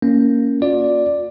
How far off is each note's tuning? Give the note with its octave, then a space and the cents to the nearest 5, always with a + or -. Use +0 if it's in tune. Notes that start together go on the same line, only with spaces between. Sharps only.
A#3 -5 C#4 +0
F4 +40 D5 +0